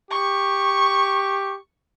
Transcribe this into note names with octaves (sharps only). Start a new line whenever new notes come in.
G4 C#6